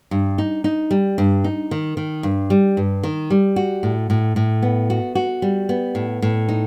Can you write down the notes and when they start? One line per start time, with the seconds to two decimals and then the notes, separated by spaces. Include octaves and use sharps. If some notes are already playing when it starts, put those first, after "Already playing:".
0.11 G2
0.38 D#4
0.64 D#4
0.91 G3
1.18 G2
1.44 D#4
1.71 D#3
1.97 D#3
2.23 G2
2.50 G3
2.77 G2
3.03 D#3
3.30 G3
3.56 F#4
3.83 A2
4.10 A2
4.36 A2
4.62 B3
4.90 F#4
5.15 F#4
5.42 G3
5.69 B3
5.95 A2
6.22 A2
6.49 D#4